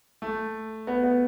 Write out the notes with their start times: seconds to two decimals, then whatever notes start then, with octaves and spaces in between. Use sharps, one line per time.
0.22 A3
0.87 B3
1.03 B3